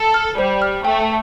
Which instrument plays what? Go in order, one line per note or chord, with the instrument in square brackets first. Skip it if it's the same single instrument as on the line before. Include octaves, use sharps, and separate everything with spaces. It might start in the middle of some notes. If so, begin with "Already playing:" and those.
Already playing: [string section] A4
[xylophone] F6
[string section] G3 [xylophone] C5
[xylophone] F6
[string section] A3 [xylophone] G5